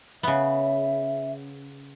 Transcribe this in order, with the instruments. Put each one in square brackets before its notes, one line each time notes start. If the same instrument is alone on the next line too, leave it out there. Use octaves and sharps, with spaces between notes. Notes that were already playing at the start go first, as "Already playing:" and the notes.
[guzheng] C#3 B3 [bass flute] E5